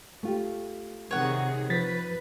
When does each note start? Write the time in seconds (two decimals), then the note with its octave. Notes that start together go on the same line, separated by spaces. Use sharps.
0.23 A3 F4 G4
1.11 C3 D#3 G#4 C#5 F#5
1.70 F3 B4 A6 B6